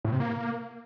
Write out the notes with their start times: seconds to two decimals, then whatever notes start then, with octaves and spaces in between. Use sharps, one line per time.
0.05 A2
0.12 C3
0.20 A#3